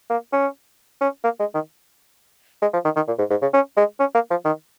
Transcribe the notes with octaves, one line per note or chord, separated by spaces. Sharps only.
A#3
C#4
C#4
A#3
G#3
D#3
G#3
F3
D#3
D#3
A#2
G#2
G#2
C#3
C#4
G#3
C#4
A#3
F3
D#3